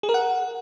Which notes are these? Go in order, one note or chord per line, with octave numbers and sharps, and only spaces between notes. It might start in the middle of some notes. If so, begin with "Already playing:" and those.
G#4
A#4
F#5